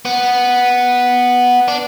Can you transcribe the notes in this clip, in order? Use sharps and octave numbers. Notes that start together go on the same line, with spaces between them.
B3
D4